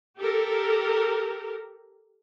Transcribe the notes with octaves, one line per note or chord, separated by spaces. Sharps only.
G4 A4 A#4